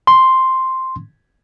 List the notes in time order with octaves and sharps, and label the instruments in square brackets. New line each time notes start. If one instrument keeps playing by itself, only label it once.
[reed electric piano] C6